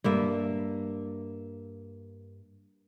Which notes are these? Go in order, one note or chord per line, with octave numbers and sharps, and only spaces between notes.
G2 A#3 E5